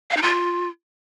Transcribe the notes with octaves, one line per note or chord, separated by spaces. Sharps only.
F5
D#4
F4